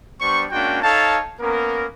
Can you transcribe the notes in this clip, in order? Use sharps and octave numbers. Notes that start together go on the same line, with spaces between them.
G3 B3 D4 C5 C#6
G#3 A#3 C#4 D4 F#4 G5
D#4 A4 C#5 F5 A5
A#3 B3 C#4 A#4